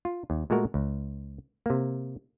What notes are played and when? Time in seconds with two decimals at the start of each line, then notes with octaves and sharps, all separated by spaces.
0.05 F4
0.30 D#2
0.50 A#2 G#3 A3 F#4 A#4
0.74 C#2
1.66 C3 A#3